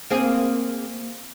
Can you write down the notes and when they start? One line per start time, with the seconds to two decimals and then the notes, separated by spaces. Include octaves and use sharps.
0.10 A#3 C4 G#4